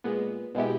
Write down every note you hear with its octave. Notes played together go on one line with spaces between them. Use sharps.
A#2 G#3 B3
B2 G#3 B3 E4 G4